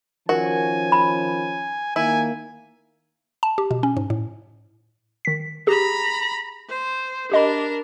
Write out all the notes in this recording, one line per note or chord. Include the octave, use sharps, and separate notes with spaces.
D#3 F3 C#4 F#4 A#4 G#5
B5
D#3 A#3 E4 G#5
A5
G4
B2
C#4
G#2
A2
D#3 B6
G4 G#4 A#5 B5
C5
D4 G4 A#4 D#5 B5